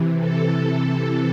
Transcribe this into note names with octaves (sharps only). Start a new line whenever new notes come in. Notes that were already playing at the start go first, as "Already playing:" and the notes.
Already playing: C3 E3
A4